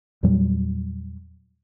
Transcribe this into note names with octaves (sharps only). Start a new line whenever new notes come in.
E2 A#2 F#3 G3